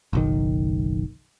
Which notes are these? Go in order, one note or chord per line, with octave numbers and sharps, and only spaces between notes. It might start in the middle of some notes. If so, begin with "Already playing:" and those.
F#1 B1 D#3